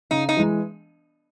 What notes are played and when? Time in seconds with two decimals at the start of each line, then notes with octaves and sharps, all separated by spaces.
0.11 C#3 D#4
0.29 D#4
0.37 E3 G#3